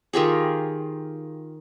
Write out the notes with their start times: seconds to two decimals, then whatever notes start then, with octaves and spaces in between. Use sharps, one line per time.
0.13 D#3 F4 G4 G#4